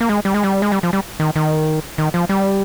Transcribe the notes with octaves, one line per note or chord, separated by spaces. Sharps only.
A#3
G#3
G3
G#3
G3
G#3
G3
F3
G3
D#3
D#3
D#3
F3
G3